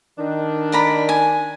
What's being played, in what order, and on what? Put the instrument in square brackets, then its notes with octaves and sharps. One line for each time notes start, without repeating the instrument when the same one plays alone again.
[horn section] D#3 D4
[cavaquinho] D5 A#5 B5
G#5